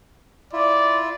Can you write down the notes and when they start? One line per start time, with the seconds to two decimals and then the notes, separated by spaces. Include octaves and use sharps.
0.53 E4 F4 D5